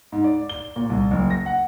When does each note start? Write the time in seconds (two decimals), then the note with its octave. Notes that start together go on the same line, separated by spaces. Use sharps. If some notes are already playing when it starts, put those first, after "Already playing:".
0.12 G#2
0.24 D5
0.49 G7
0.76 A#2
0.90 C2
1.11 F#1
1.30 A#6
1.46 F#5